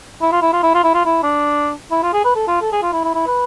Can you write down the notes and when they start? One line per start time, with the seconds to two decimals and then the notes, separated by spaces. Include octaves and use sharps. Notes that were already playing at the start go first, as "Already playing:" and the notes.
0.21 E4
0.32 F4
0.42 E4
0.53 F4
0.63 E4
0.74 F4
0.84 E4
0.94 F4
1.05 E4
1.23 D4
1.91 E4
2.03 F4
2.13 G#4
2.25 B4
2.36 A4
2.48 F4
2.62 A4
2.72 G#4
2.82 F4
2.92 E4
3.04 E4
3.14 E4
3.27 B4